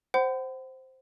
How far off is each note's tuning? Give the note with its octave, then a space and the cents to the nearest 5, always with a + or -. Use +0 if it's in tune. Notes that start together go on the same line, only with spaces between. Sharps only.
C5 +0 F#5 +35 B5 +45